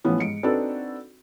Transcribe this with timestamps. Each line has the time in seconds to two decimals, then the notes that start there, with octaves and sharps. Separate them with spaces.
0.04 A2 E3 F3 B3 C#4
0.19 G#2 C#7 D7
0.43 C4 D4 D#4 F#4 A4 B4